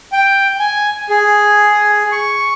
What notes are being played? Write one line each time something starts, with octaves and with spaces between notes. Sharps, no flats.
G5
G#5
G#4
C#6